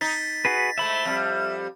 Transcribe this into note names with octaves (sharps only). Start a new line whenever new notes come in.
D#4 A6 B6
F#4 G#4 B4
G#2 A3 E5 B5
F2 G3